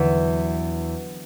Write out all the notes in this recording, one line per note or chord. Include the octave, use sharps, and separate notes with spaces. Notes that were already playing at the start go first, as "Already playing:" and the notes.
Already playing: E2 D3 F#3 E5